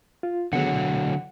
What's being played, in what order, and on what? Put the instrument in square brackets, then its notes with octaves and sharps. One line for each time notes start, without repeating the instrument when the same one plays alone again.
[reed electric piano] F4
[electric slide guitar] D3 F#3 [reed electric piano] D#3 B3 G#4 [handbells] F#5
[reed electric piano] B2